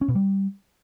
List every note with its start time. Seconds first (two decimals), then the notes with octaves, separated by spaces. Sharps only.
0.01 C#4
0.08 B2
0.15 G3